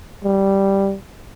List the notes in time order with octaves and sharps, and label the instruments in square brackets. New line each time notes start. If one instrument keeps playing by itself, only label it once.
[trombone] G3